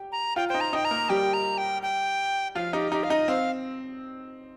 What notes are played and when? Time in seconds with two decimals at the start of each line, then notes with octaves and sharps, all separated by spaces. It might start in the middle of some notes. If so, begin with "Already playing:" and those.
Already playing: G4 G5
0.12 A#5
0.36 F4 F5 G5
0.49 C5 G5
0.54 D#4 D#5
0.61 A#5
0.73 D#4 D#5 G5
0.85 A#5
0.91 A#3 A#4
1.09 G3 G4 G5
1.34 A#5
1.58 G5
1.82 G5
2.55 F3 F4 F5
2.73 D#4 G4
2.92 D#4 G4
3.04 F5
3.10 D#4 D#5
3.28 C4 F5